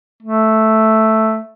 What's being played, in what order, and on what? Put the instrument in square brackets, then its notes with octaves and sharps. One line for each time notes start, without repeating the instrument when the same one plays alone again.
[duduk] A3